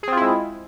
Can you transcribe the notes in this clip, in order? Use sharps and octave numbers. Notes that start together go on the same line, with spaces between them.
G#3 C4 E4 F4 G#4